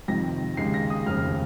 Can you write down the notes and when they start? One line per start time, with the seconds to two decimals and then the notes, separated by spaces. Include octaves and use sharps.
0.08 F2 C3 D#3 A#6
0.57 D#2 C#3 G#3 C7
0.74 A#6
0.90 D#6
1.06 F1 D#2 C#3 F6